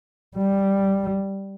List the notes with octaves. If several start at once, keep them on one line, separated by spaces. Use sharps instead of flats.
G3